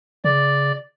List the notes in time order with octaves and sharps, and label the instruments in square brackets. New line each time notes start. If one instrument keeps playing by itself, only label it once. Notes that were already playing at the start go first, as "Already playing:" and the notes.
[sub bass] C#3 [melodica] D5